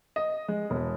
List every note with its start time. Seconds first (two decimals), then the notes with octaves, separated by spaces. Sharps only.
0.16 D#5
0.48 G#3
0.70 E1